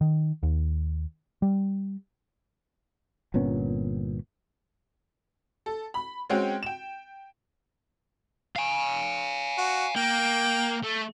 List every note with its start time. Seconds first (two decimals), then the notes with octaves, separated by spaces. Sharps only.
0.01 D#3
0.43 D#2
1.42 G3
3.34 G1 A#2 B3 C#4
5.66 A4
5.94 B5
6.30 G#3 C4 C#4 F#4 G5
6.63 G5 E7
8.56 F5 G#5
9.58 F#4
9.96 A#3 G5
10.84 A3